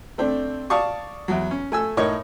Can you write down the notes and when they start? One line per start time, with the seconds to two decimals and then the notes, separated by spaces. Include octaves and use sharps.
0.18 A3 C4 D4
0.70 D5 F5 A5 C#6 D#6
1.28 E2 F#3
1.51 C#4
1.72 A3 G#5 E6
1.97 A2 D#4 A#4 C#5 C#6